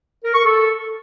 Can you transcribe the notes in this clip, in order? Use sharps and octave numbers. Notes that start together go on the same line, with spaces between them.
A#4
C#6
A4